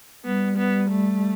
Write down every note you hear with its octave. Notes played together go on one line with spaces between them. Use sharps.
G3 B3
B3
A3